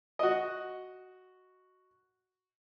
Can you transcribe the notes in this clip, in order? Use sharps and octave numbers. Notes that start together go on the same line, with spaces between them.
F#4 D#5